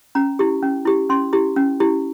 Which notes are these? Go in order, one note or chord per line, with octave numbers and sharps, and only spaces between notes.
C#4 A#5
E4 G4
C#4
E4 G4
C#4 C6
E4 G4
C#4
E4 G4